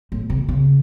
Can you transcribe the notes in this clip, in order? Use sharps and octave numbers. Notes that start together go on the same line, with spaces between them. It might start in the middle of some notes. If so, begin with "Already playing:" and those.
A2
C3
C#3